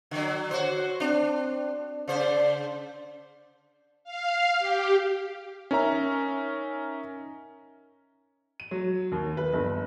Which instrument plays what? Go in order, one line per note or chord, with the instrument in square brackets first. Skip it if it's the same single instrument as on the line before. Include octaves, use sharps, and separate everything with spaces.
[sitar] D3 F#3
[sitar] F#4 C5 [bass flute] C#5
[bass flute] C4 [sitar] D4
[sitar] C#3 C5 [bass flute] D5
[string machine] F5
G4
[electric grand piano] C#4 D#4 A#4 E5 A#5
[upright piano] D#7
F#3
D#2
B4
G1